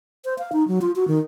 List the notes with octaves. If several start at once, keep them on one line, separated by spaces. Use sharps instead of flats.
C5
F5
D#4
F#3
F4
F#4
D#3